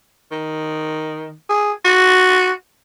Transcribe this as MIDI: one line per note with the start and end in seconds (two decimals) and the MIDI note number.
0.32 1.33 51
1.49 1.72 68
1.85 2.51 66